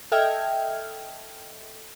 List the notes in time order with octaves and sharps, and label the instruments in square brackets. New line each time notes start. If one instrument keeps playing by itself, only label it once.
[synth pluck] A4 D#5 E5 G5 F6 G#6